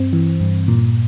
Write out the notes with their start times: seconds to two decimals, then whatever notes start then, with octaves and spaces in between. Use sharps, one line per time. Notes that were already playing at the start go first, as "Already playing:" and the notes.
Already playing: G2 C4
0.13 E3
0.41 G2
0.68 A#2